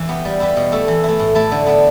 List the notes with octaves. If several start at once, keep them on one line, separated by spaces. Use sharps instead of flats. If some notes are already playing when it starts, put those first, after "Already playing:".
Already playing: E3
B3 G4 B4
G3
E4 G4 B4
B2
A3 E4 A4
E3
A3 E4
A2
A3 E4 A4
D3
B3 D4 B4